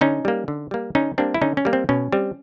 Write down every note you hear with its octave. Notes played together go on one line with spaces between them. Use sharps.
D3 C#4 D#4
G3 A#3
D3
G3 A#3
D3 C#4 D#4
G3 A#3 C4 D4
E4
D3 C#4 D#4
C#4
G3 A#3
C4
B2 C#4
G3 C4